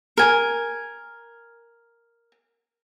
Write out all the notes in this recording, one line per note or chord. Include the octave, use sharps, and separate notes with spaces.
A#4 G#5